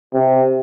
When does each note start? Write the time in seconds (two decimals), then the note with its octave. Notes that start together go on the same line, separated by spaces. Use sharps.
0.14 C3